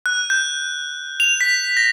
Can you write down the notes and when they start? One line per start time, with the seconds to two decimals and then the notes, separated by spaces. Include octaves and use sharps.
0.06 F#6
0.30 G6
1.20 F7
1.41 B6
1.77 A#6